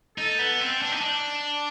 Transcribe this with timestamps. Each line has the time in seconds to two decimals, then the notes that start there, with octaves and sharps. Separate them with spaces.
0.17 D#4 A4
0.39 B3
0.61 C4
0.82 D4
0.92 D#4
1.01 D4